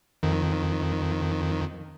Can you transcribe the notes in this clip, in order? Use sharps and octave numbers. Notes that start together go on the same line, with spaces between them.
F2 D#3